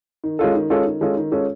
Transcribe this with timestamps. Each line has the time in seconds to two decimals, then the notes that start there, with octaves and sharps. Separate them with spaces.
0.24 D#3
0.39 G#3 C#4 F4 A4
0.55 D#3
0.70 G#3 C#4 F4 A4
0.86 D#3
1.01 G#3 C#4 F4 A4
1.17 D#3
1.32 G#3 C#4 F4 A4